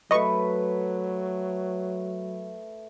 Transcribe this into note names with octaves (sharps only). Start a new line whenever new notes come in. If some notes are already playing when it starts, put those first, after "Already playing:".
F#3 A3 B4 D#5 C#6